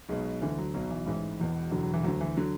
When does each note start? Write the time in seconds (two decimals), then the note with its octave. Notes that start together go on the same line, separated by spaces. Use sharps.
0.09 B1 B2 G#3
0.42 D2 D3 E3
0.58 F#3
0.74 B1 B2 F#3
0.90 E3
1.06 A1 G#2 E3
1.40 E1 E2 B2
1.71 E1 E2 D3 F#3
1.83 F#3
1.93 E3
2.04 D2 D3 F#3
2.21 E3
2.37 D3 F#3